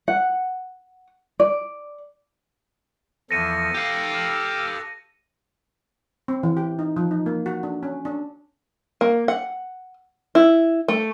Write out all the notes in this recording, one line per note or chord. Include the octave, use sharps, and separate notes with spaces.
F#5
D5
E2 E3 F3 A4 A#6 C#7 D#7
G4 F5 D6
D6 E6 F6
C4
E3
G4
D#4
F3
D#4
A#3
F#4
D4
C#4
D4
A#3
F#5
E4
A3